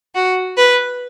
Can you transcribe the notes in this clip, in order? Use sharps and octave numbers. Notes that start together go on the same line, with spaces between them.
F#4
B4